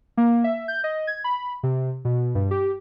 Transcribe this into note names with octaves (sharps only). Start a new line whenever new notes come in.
A#3
E5
G6
D#5
G#6
B5
C3
B2
G2
G4